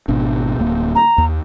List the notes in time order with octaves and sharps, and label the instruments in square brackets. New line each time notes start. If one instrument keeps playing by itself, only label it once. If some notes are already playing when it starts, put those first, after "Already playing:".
[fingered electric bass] G#1 B2 D4
D1 A#3
[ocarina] A#5
[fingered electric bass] D#2